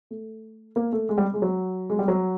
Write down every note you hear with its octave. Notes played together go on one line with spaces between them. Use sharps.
A3
A#3
A3
G#3
G3
G#3
F#3
G#3
G3
F#3